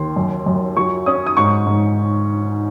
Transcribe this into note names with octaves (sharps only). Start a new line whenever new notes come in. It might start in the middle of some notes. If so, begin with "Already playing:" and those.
Already playing: D#2 C6
F#2
F#2
F#3 C#6
C#4 D#6
D#6
G#2 C#6
G#2